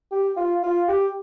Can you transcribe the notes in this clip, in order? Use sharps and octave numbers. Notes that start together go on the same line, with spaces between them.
G4
F4
F4
G4